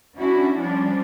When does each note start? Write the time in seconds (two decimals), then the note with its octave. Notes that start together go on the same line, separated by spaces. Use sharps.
0.17 C#4 D4 E4 F#4
0.58 F3 G3 C#4 D4